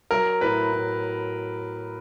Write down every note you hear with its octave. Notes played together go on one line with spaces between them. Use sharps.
F#3 A#4
A2 B4
A2